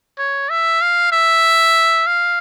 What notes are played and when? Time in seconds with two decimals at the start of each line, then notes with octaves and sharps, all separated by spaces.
0.18 C#5
0.50 E5
0.81 F5
1.12 E5
2.07 F5